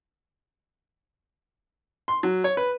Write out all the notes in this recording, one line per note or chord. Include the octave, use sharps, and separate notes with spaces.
C6
F#3
C#5
B4